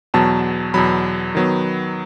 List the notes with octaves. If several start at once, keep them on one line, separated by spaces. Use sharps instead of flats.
E2 B2 F#3 A5
E2 B2 F#3 B5
D#3 F#3 B3